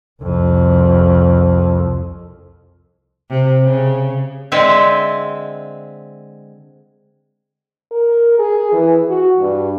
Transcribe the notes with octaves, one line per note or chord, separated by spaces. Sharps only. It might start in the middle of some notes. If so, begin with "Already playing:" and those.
C2 F2
C3
C#3
D3 G#3 C4 E5
A#4
G#4
E3
F#4
G2